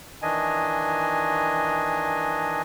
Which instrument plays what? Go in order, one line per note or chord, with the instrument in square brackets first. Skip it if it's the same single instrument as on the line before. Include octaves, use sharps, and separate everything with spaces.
[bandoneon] D#3 E3 D4 D#5 G#5